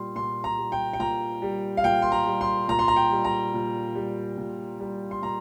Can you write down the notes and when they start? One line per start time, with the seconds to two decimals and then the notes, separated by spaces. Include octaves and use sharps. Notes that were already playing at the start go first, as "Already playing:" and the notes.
Already playing: A#2 G3 C6
0.16 A#2 C6
0.44 A#5
0.58 G3
0.72 G5
0.93 G5
0.99 A#2 A#5
1.42 G3
1.77 F5
1.84 A#2 G5
2.02 C6
2.12 A#5
2.26 G3
2.41 C6
2.68 A#2 A#5
2.79 C6
2.88 A#5
2.96 G5
3.11 G3
3.25 A#5
3.54 A#2
3.95 G3
4.38 A#2
4.80 G3
5.11 C6
5.22 A#2 A#5